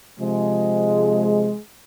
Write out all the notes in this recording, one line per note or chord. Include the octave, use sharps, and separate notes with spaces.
C3 F3 G#3